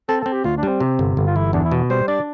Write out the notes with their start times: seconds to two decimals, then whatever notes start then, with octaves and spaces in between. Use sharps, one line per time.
0.09 C4 A4
0.21 A4
0.26 C4
0.33 G4
0.44 D2 F4
0.57 D4
0.63 G3
0.68 C4
0.80 C3
0.99 G1
1.17 G1
1.27 F4
1.35 E3 E4
1.53 E2 D4
1.65 E4
1.71 B2
1.90 G3 C5
2.08 D4 D5